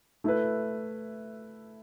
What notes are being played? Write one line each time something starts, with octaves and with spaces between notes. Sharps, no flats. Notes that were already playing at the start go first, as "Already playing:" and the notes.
A3 E4 B4